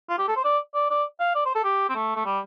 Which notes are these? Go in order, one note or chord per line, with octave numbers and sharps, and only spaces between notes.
F4
G4
A4
C5
D5
D5
D5
F5
D5
C5
A4
G4
C4
A3
A3
G3